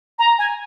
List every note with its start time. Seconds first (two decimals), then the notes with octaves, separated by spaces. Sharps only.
0.19 A#5
0.38 G#5